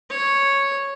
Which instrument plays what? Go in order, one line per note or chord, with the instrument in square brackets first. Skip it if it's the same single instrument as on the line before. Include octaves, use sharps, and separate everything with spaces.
[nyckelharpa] C#5